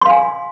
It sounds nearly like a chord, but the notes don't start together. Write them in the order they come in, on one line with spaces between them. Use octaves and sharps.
C6 F5 G#5